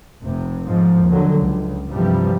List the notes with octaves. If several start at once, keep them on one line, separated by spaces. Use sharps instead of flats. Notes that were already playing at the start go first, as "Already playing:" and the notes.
F1 C3
G#2 F3
D#2 D3 F#3
C#2
G2 C3 E3 F3 G3